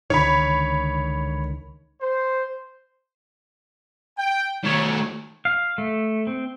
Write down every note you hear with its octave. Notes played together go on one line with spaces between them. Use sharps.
C#2 D3 D#3 C#5 B5
C5
G5
D#3 A3 C#5
F5
A3
C4